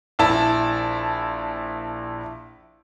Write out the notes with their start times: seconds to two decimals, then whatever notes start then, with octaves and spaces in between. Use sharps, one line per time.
0.19 A#1 E4 A5